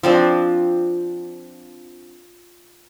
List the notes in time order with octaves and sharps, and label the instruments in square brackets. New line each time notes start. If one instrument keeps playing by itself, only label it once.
[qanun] F3 C4 D4